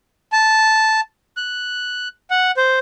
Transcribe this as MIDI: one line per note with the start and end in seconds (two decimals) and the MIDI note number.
0.32 1.00 81
1.37 2.08 90
2.31 2.51 78
2.57 2.79 72